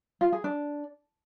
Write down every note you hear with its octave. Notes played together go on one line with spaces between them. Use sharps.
F4
G#4
D4